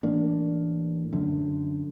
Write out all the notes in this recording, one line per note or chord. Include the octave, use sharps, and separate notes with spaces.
A1 A#3 D4
F#2 D3